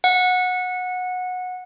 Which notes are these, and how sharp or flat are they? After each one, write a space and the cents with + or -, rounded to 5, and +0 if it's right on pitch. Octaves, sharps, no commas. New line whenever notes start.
F#5 -20